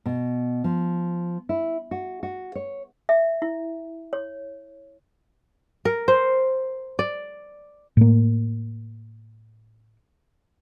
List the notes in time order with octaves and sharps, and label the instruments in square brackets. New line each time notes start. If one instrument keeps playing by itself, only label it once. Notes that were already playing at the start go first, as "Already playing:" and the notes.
[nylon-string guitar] B2
F3
E4
F#4
F#4
C#5
[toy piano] E5
E4
C#5
[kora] A#4
C5
D5
[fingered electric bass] A2 A#3